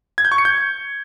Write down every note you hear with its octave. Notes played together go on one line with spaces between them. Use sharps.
G#6
G6
C#6
C#7
G6